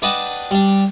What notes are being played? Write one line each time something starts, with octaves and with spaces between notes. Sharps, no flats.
D4 B4 D#5 F#5 G5 A5
G3 D4